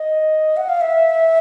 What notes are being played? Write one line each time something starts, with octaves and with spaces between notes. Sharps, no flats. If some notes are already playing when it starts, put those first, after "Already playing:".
Already playing: D#5
F#5
F5
E5